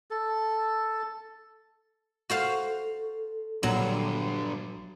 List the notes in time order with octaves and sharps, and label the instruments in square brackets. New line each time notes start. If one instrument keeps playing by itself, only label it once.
[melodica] A4
[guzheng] F#4 C5 F5 [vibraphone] A4
[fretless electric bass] A#1 A#2 [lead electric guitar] G2 D3 [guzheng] F#3